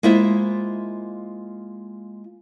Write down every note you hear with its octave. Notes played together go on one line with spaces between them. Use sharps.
G#3 A#3 E4 F4 C5 E5